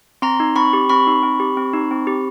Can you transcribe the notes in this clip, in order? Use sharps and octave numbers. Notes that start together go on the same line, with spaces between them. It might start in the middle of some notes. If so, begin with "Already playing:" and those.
C4 A#5 C6
D#4
C4 B5 C#6
G4
C4 B5 C#6
D#4
C4
G4
C4
D#4
C4
G4